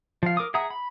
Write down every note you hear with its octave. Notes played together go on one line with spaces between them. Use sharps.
F3 F5
A#4 D6 D#6
G#4 E5 F#5 A#5 D#6
B5